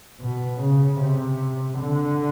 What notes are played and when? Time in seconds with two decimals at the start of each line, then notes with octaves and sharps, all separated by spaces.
0.20 B2
0.60 C#3
0.99 C3
1.78 D3